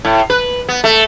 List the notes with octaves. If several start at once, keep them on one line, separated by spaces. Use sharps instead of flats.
A2
B4
B3
A3